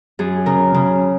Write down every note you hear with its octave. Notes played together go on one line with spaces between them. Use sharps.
F#2 G#4
C#3 A#4
C#3